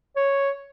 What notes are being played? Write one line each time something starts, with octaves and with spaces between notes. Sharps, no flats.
C#5